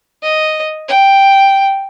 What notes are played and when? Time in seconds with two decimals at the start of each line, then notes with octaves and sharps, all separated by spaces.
0.23 D#5
0.88 G5